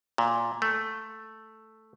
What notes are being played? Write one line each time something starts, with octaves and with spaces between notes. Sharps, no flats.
A#2
A3